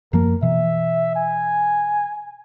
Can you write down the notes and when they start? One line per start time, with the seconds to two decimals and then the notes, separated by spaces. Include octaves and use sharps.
0.13 F#2 F3 A#3 A#4
0.42 B2 E3 E5
1.16 G#5